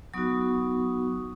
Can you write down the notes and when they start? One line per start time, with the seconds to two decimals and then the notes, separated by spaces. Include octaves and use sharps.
0.14 F#3 B3 D#4 F#4 C#6 D#6